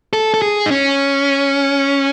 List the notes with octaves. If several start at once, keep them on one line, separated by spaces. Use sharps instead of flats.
A4
A4
G#4
D#4
C#4